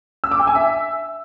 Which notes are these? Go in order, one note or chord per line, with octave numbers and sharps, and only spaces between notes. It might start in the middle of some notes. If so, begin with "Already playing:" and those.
E6
D6
G5
G#5
E5